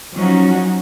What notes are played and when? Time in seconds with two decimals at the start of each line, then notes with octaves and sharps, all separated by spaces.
0.13 F3 F#3 C#4 D#4 F#4